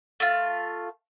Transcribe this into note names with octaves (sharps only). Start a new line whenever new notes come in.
A3 F4